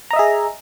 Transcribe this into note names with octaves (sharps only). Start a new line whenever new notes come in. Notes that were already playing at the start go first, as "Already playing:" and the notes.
G#4 D#5 E5 A#5